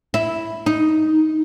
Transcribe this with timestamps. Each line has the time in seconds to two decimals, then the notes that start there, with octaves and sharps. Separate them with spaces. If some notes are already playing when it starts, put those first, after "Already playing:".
0.14 E4
0.66 D#4